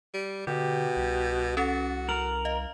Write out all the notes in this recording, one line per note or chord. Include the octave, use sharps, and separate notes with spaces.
G3
B2 D3 G4
C2
C#4 F#4 A4 A6
A#4 F6 F#7
D#5 F5